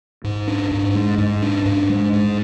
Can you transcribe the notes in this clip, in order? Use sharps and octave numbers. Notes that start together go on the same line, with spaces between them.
G#2
D4
G#2
G#3
G#2
D4
G#2
G#3
G#2